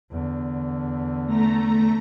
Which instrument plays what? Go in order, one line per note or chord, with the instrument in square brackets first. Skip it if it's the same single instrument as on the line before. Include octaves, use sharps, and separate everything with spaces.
[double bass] E2 D3
[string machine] A3 A#5 A#6